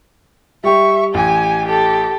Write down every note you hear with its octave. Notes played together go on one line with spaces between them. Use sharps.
G3 G4 E5 C#6
A1 G4 G5 G#5
G4 A4